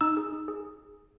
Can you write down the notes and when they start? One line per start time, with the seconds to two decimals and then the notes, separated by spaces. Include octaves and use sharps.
0.01 D#4 E6
0.17 G#4
0.32 D#4
0.48 G#4